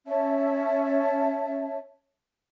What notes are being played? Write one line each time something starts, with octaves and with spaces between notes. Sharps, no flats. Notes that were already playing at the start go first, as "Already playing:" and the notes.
C#4 C#5 E5 A5